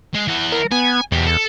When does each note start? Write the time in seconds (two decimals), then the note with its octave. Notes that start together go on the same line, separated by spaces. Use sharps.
0.14 G#3
0.27 E3 F#5
0.52 A#4
0.72 B3 G#5
1.12 E2 B2 G4
1.26 A4